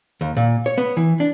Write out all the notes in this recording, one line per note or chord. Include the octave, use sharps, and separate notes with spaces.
D#2
A#2
C#5
B3
E3
D4